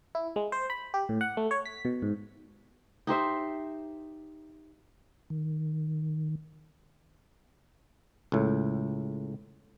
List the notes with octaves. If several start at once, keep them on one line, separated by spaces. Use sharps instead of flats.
E4
G#3
C5
B5
G4
A2
F#5
A3
C#5
B6
B2
G#2
D#4 G4 C5 E5
D#3
C#2 A2